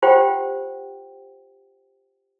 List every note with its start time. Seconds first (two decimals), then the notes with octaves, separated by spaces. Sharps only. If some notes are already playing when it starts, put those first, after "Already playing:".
0.02 F4 G4 C5 F#5 G5